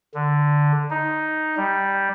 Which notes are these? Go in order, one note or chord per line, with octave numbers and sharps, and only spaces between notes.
D3
D#4
G3